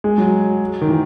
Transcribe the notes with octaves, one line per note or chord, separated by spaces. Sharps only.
G#3
F#3
D#3
E3